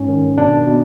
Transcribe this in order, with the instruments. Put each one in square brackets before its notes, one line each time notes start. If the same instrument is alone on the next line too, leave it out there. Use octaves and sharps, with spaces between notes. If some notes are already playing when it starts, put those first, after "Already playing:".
Already playing: [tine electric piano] G#2 C#4
D#3
B2 D4
B2